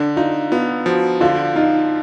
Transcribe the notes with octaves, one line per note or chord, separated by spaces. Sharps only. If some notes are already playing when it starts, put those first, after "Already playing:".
Already playing: D3 D4
D#4 F4
B3 F4
F3 F#4
D3 F4
D#4 F4